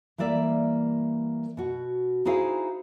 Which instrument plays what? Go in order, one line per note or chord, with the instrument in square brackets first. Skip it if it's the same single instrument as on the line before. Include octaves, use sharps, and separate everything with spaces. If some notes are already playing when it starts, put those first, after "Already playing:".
[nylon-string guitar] E3 G3 A#3 D5 E5
B2 F#4
D#4 E4 F#4 G#4 C5 F5